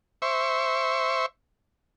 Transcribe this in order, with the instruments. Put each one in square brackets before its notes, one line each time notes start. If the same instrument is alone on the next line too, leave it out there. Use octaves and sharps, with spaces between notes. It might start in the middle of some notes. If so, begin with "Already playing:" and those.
[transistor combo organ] C5 E5 C#6